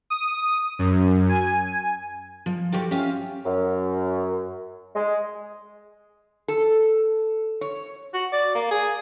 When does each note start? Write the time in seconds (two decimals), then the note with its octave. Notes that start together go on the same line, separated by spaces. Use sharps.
0.10 D#6
0.79 F#2
1.29 G#5
2.46 F3
2.72 F3 F#4 G4 A4
2.91 C#4 F4 G4 E5 F5 G#5
3.45 F#2
4.95 G#3
6.48 A4
7.61 C#5
8.14 F#4
8.32 D5
8.55 A#3
8.71 G#4